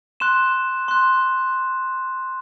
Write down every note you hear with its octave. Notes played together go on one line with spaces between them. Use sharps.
C6 F#6 E7
C6 F#6